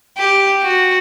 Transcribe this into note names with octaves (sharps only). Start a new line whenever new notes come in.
G4
F#4